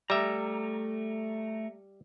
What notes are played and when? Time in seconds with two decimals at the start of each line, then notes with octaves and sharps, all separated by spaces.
0.10 G3 A3 E5 A#5